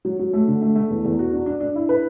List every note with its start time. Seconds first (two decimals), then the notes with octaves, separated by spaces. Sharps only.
0.05 F#3
0.19 F#3
0.33 A3
0.48 D3
0.62 A3
0.75 A3
0.90 E2
1.04 E2
1.19 F#4
1.33 D4
1.46 D4
1.60 D4
1.76 E4
1.89 B4